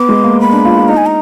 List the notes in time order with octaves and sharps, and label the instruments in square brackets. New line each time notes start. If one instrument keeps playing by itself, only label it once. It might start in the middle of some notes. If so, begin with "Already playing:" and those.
Already playing: [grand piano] B3 [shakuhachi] D6
[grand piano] G#3
A#3
[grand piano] B3 [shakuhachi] B5
[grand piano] D4
F4
F4
[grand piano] D#4 [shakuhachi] A#5
[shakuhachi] G#5
A#5